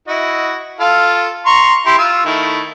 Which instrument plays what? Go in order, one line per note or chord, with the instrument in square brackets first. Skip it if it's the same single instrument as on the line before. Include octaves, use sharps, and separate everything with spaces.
[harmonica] E4 F#4 D#5
F4 A4 F5
A#5 C6 C#6
E4 G4 C6
F4 E6
D#3 A3 E4